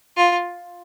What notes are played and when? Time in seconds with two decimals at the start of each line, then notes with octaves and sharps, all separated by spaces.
0.17 F4